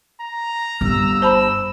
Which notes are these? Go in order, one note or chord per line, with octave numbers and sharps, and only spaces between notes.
A#5
G1 E6
C5 A5 B5